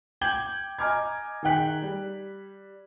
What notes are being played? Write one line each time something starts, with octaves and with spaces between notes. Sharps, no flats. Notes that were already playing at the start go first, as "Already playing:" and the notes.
G5 D6 G6 G#6 F#7 G7
D#5 G#5 A#5 D6 F6 G#6
D#3 D#4 G#4 G5 F#6 B6
G3